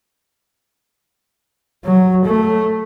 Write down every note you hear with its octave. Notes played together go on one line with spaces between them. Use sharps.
F#3
A3